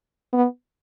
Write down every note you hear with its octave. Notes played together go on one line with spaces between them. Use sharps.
B3